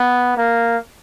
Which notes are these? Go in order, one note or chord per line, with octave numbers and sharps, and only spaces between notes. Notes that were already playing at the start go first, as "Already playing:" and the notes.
Already playing: B3
A#3